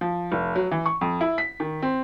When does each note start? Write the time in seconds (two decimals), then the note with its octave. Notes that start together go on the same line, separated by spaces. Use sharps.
0.01 F3
0.32 F1
0.56 F#3
0.71 E3
0.86 C#6
1.01 F2
1.21 E4
1.38 B6
1.60 D#3
1.82 C4